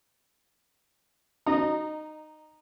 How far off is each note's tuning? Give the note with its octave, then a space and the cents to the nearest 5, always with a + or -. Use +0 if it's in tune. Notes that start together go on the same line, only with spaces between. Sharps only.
D#4 -15 D#5 -30 A#5 +0